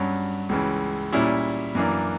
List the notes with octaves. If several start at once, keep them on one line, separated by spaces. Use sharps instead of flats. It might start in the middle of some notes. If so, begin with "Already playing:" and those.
Already playing: G2 F#3 C#4
C#2 C#3 E3
A#2 G3 C#4 E4
F#2 E3 A#3 D4